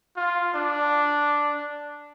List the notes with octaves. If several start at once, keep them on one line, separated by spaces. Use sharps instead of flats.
F4
D4